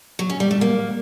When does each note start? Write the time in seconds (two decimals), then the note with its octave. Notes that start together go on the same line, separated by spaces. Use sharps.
0.19 F#3
0.30 C#4
0.40 G3
0.51 A3
0.61 A#3